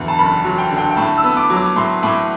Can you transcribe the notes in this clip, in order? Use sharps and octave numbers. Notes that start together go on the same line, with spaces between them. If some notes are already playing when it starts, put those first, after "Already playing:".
Already playing: E2 D3 F#3
A5
F#1 B5
F#3
G5
D3
G5
G5
A2 A5
E6
B3
D6
F#3
D6
A2 C6
A2 D6